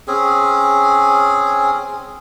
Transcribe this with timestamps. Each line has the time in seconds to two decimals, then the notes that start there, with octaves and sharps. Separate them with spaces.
0.08 C4 C#4 G#4